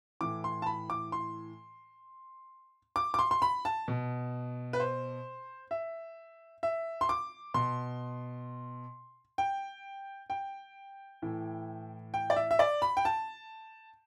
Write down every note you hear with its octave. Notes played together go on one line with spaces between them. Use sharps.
A2 E3 D6
C6
A5
B5
D6
C6
D6
D6
C6
C6
B5
A5
B2
B4
C5
E5
E5
C6
D6
B2 C6
G5
G5
A2 E3
G5
D5
E5
E5
D5
B5
G5
A5